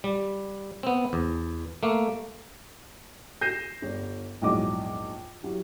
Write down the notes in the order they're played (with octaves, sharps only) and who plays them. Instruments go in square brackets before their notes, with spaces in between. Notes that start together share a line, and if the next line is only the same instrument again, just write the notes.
[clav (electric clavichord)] G3
B3 C4
E2
A3 A#3
[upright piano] G6 A#6 C7 D#7 E7
G1 G3
A#1 E2 G#2 F#3 D#5 D6
F#3 E4 G4